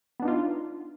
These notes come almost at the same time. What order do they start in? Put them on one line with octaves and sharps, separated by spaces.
B3 D4 D#4 F4